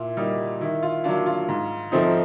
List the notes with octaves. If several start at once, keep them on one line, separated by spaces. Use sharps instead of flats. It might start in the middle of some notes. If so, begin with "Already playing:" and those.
Already playing: A#2 E4
G3 A#3 D#4
D#3 E4
F4
F#3 A#3 D4 F4
F4
G#2
F3 A3 C4 D#4